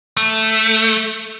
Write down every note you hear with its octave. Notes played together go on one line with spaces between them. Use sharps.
A3